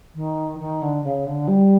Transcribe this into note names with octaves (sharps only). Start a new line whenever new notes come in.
D#3
D#3
D3
C#3
D3
G3